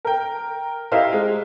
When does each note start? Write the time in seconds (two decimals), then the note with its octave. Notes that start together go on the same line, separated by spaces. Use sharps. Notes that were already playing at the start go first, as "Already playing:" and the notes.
0.05 A#4 G5
0.92 E4 G4 A#4 C5 D#5 F5
1.13 G#3